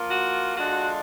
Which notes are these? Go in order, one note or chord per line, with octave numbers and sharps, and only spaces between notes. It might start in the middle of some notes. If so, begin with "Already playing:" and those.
Already playing: F3 A#3 F4
F#4
D3 G#3 D4 F4 F#4